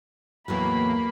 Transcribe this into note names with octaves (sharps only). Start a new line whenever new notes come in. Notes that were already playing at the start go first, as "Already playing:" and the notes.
E2 A2 F#3 A#3 B5